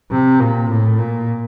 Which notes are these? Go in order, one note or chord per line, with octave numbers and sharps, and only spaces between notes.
C3
A#2
A2
A#2